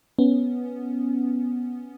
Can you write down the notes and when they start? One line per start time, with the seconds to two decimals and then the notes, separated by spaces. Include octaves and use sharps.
0.19 B3 C#4